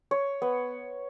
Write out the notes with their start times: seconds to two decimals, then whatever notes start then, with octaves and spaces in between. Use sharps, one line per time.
0.11 C#5
0.42 B3